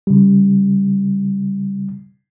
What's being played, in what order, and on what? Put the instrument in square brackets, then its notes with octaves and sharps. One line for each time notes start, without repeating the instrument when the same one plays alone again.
[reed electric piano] C#3 G3